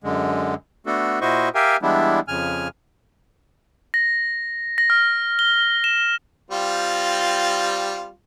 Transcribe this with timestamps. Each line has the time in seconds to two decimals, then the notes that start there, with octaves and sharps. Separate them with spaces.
0.04 F#2 D3 G#3
0.86 A3 B3 D4 F#4 A4
1.21 A#2 E4 F#4 C5 D#5 C#6
1.55 G4 A#4 E5 F5 G5 G#5
1.82 E3 G3 G#3 B3 D4 E4
2.28 F2 C#3 G#5 F6
3.94 A#6
4.78 A#6
4.90 F6
5.39 G7
5.84 E7
6.51 G3 C4 F4